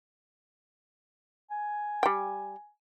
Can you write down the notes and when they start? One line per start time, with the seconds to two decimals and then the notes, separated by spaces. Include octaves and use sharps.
1.51 G#5
2.03 G3 G5